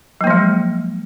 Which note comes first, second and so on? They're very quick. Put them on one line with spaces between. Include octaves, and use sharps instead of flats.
F#3 A#3 F3 G#3